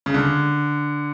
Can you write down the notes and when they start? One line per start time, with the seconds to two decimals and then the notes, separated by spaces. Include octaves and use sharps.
0.06 C#3
0.14 D3